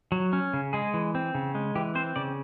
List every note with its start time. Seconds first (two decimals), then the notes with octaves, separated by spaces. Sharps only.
0.12 F#3
0.33 C#4
0.54 C#3
0.73 G#3 G#4
0.94 E3
1.15 C4
1.35 C#3
1.55 G#3
1.75 E3 G4
1.95 C4 C5
2.16 C#3 D5